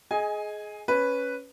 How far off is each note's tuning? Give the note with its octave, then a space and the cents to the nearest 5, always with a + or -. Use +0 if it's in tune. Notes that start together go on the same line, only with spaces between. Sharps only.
G#4 +20 D#5 +10 G#5 -5
C#4 +0 B4 +0